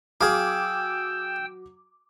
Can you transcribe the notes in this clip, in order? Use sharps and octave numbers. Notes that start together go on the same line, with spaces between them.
F#3 G#4 F5 G5 D6 E6